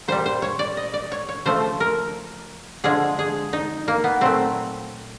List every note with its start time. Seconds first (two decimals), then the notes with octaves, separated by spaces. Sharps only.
0.08 A#2 G3 C5
0.26 C5
0.42 C#5
0.59 D5
0.77 D#5
0.94 D5
1.12 C#5
1.29 C#5
1.45 C#3 F3 A3 C5
1.80 A#4
2.84 D3 F3 G#3 G#4
3.19 G#4
3.53 D#4
3.88 A#3
4.04 B3
4.21 A#2 F#3 A3 C4